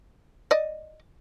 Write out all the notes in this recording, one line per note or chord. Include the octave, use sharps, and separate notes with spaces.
D5 D#5